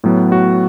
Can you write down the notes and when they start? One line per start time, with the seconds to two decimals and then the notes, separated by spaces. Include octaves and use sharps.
0.04 A2 F#3 B3
0.32 F#4